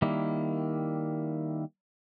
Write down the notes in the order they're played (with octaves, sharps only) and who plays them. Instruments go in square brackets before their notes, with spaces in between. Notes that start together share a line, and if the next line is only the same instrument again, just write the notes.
[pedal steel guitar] D#3 G3 A#3 E4